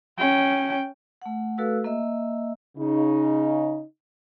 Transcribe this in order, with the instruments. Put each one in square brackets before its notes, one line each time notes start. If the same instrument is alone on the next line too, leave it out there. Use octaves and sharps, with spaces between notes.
[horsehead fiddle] C#4 G5
[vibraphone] A3 F#5
A3 F#4 A4 B4 F5 E6
A#3 D#5 E5 E6
[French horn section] C#3 D#4